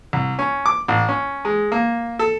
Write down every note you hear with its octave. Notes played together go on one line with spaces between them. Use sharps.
C2
C#4
D6
A1
C#4
G#3
A#3
A4